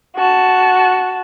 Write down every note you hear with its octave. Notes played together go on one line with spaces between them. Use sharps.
F#4 A5